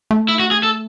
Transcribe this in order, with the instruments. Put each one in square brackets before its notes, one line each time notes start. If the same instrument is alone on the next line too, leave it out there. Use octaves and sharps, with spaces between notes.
[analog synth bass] A3
[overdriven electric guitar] E4
F#4
G#4
A4